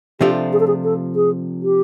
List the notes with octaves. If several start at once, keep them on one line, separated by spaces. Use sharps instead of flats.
C3 F3 A3 D4 F4 G4
G#4
A4
G#4
A4
G#4
G4